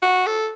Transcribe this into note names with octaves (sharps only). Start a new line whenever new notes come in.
F#4
A4